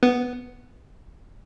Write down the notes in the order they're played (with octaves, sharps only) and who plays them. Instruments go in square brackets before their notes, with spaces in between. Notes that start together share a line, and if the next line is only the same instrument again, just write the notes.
[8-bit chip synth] B3